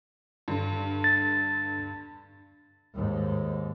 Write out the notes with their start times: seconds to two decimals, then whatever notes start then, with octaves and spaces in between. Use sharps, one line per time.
0.48 G2 D3
1.04 A6
2.95 D#2 G#2